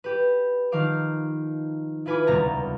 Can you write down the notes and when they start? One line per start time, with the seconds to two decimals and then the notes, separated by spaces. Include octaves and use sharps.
0.04 G4 B4
0.72 D#3 F3 F5 D6
2.06 E4 F4 B4 G#5 B5 D6
2.27 D#1 C#2 C3 B3 A#5 A6